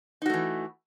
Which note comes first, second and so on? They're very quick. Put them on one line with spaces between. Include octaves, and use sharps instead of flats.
D#4 F#4 A3 E3